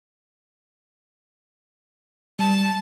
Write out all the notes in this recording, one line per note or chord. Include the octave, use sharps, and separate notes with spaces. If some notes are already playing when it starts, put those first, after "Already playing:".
G3 A5